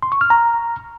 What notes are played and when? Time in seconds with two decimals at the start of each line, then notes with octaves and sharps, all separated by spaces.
0.03 C6
0.12 C#6
0.21 F6
0.30 A#5